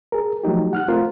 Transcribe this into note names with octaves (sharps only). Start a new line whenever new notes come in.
G#4 A#4
F3 F#3 A3 D#4 G4
F#5 F6 F#6
A3 C4 F4 A#4